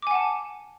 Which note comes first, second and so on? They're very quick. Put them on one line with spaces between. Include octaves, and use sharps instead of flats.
D6 G#5 F#5 A5